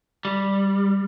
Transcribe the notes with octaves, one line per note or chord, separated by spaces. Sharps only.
G3